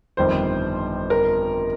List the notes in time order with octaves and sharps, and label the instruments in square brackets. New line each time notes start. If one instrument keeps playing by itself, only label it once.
[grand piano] G1 F2 D#3 G3 [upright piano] C5
[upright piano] A#4